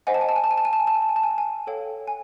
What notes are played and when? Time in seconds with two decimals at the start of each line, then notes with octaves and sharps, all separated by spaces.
0.07 C5 D#5 F#5 G#5
0.14 A5
0.21 G#5
0.29 A5
0.36 G#5
0.44 A5
0.51 G#5
0.58 A5
0.65 G#5
0.73 A5
0.80 G#5
0.87 A5
0.95 G#5
1.02 A5
1.09 G#5
1.16 A5
1.23 G#5
1.31 A5
1.38 G#5
1.67 A4 C#5 F5 G5
2.07 G#5